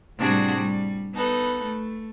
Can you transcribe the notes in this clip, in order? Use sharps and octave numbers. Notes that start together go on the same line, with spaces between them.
A2 C3 G3 D4 F#4 G#4
G3
B3 D#4 A4 B4
A3